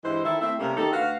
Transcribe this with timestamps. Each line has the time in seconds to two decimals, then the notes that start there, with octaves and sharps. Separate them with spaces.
0.04 G2 E3 G#3 E4 C5
0.24 D#3 E4 A4
0.41 A3 C4 E4 E5
0.59 C3 G3 A3 A#3 C#4 A#4
0.77 D#3 D#4 G4 A4
0.92 D2 F#4 B4 F5